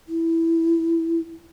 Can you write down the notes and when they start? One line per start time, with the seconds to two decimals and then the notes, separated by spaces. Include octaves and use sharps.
0.08 E4